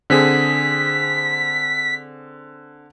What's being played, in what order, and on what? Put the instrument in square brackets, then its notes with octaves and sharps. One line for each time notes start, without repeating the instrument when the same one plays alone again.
[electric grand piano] D3 C4 G#4 [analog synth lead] B6